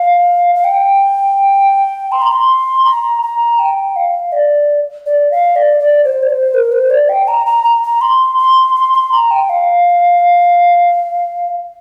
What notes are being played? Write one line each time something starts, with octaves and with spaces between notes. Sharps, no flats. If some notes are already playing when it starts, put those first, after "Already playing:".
Already playing: F5
F5
G5
C6
A#5
C6
A#5
A#5
G5
F5
D5
D5
F5
D5
D5
C5
D5
C5
A#4
C5
D5
G5
A#5
A#5
A#5
A#5
C6
C6
C6
C6
A#5
G5
F5